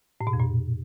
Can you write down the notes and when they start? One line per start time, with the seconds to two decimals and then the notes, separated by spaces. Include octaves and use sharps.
0.21 A2
0.27 B2
0.33 F2
0.40 A#2